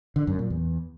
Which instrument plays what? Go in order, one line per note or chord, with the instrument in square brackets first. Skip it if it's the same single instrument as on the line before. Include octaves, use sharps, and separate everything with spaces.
[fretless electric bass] D3
F#2
A#2
E2